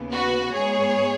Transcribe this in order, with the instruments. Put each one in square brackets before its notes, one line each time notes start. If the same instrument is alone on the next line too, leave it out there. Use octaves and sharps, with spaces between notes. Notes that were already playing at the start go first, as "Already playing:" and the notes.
Already playing: [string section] D#2 C#3 B3
F#4 B4
G#2 G#3 B3 G#4 C#5